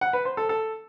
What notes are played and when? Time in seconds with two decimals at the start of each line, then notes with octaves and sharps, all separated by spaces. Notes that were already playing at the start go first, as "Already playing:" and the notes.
0.01 F#5
0.13 B4
0.25 C5
0.37 A4
0.49 A4